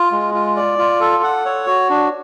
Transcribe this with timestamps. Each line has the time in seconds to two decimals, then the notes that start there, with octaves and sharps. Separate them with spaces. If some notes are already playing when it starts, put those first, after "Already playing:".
Already playing: F4
0.12 G#3
0.34 F4
0.56 D5
0.78 F4
1.01 A4
1.23 F#5
1.45 C#5
1.67 F#4
1.90 D4